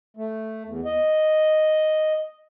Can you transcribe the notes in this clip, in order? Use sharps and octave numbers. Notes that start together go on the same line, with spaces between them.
A3
E2
D#5